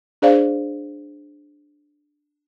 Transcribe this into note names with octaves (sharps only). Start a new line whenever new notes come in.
D4 G#4 C5 D5 F5